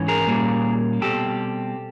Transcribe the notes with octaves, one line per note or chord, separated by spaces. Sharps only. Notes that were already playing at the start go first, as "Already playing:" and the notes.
Already playing: G#2 E3 C#4
G#4 A#4
A#2 G3 A#3 C#4
B2 G3 C4 G4 A4